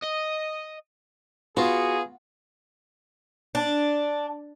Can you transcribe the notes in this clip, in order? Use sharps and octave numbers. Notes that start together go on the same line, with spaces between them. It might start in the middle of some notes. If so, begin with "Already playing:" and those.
D#5
B3 F4 F#4 G#4
D4